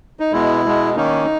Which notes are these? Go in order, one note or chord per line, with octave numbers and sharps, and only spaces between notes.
D#4
B2 G#3 B3 E4
B2 G#3 B3
D#3 A#3 C#4 D#4